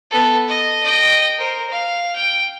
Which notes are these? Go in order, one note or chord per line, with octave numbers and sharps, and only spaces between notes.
B3 A4
D#5
D#5 G5
A#4 C5
F5
G5